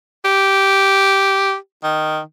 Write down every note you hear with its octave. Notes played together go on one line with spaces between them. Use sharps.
G4
D#3